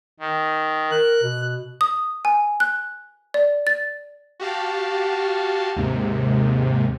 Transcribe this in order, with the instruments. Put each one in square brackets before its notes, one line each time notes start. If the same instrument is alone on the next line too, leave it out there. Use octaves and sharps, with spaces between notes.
[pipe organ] D#3
[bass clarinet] A#4 [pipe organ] F#6
[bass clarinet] B2
[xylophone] D#6
G#5
F#6
D5
A6
[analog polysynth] F#4 G4 F5 A5
D#2 G#2 C3